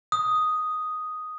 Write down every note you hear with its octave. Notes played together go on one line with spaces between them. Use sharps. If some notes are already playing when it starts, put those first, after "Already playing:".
D#6